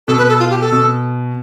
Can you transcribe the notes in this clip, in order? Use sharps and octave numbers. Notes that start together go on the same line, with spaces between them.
B2 A4
B4
A4
F4
G4
A4
B2